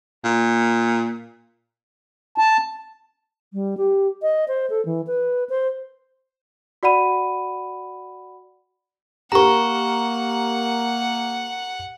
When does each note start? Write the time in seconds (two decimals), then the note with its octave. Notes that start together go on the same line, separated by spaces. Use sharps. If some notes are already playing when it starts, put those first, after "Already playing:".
0.24 A#2
2.38 A5
3.53 G3
3.77 G4
4.22 D#5
4.48 C5
4.70 A4
4.85 E3
5.07 B4
5.50 C5
6.83 F#4 D5 F#5 B5 D#7
9.32 A#3 G4 A#4 F#5 A#5 C#6